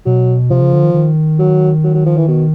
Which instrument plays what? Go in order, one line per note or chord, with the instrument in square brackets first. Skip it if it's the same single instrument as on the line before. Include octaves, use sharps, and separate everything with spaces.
[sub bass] B2 [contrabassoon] F#3
[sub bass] C3 [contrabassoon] F3
[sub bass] C#3
D3
D#3
D#3
[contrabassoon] F#3
F#3
F#3
F3
E3
B2